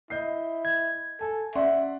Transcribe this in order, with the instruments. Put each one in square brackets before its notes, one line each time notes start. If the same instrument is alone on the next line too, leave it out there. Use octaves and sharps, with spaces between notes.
[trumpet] E4 [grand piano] D#5 G6 C7
[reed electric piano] G#6
[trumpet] A4 [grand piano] G#5
[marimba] C#4 [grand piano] D5 F#5 C6 [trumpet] E5